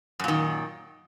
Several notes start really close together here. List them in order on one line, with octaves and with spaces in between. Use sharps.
F#2 A#2 D#3